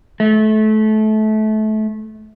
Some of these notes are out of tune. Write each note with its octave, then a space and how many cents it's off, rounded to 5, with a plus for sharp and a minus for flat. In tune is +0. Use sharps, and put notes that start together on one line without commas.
A3 -25